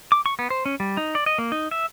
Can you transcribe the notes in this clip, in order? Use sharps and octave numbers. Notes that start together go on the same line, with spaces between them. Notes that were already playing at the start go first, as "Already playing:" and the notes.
D6
C#6
B3
C5
C#4
G3
D#4
D5
D#5
A#3
D#4
E5